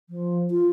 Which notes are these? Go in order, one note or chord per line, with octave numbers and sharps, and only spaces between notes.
F3
F4